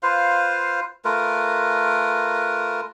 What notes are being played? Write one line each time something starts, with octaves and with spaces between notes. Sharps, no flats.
F4 B4 C5 F5
A3 F4 A#4 B4